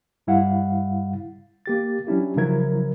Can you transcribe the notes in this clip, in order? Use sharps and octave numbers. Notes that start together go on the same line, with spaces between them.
G2 G3 E4 F5 F#5
A#3 G4 A6
F#3 C#4 D4 E4 G4
C#3 F3 F#3 E4 A#4 G#6